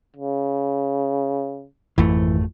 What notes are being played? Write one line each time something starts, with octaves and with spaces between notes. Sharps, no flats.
C#3
G#1 F2 E3 A3